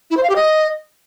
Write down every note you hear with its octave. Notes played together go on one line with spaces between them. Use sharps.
E4
C5
F5
G4
D#5